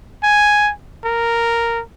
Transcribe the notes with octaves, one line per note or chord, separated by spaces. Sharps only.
G#5
A#4